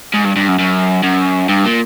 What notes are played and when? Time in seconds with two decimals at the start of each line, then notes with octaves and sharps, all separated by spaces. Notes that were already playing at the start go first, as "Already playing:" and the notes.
0.14 G#2
0.25 G2
0.36 G2
0.48 F#2
0.59 F#2
1.03 F#2
1.49 G2
1.65 A#2